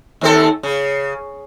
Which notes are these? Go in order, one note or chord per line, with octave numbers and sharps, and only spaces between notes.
D#2 C4 A4
C#3